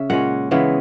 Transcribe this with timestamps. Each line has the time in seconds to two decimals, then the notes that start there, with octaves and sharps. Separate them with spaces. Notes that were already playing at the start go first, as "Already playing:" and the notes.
Already playing: C#3 E5
0.10 A#2 G#3 C#4 F#5
0.51 C#3 E3 G#3 B3